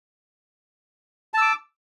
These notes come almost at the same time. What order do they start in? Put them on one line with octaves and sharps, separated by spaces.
A5 E6 D6